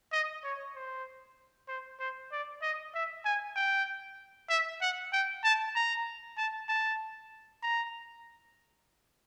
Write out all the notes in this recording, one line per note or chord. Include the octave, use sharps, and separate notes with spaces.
D#5
C#5
C5
C5
C5
D5
D#5
E5
G#5
G5
E5
F#5
G5
A5
A#5
A5
A5
A#5